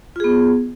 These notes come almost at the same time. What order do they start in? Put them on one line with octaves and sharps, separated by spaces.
F4 G#4 B3